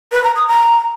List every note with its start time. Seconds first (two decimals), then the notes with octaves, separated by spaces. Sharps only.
0.12 B4
0.23 A#5
0.35 D#6
0.47 A#5